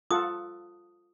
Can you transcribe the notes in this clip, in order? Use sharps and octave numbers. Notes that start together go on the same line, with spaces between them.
F4 A4 F#5 D#6